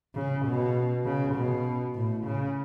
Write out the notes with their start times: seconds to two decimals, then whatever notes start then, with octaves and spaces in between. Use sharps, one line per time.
0.15 C#3
0.46 B2
1.05 C#3
1.35 B2
1.95 A2
2.26 C#3